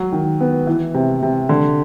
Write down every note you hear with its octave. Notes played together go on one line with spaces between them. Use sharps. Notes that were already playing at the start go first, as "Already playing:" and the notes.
Already playing: F#3
D#3
B3
E3
C3
C3
D3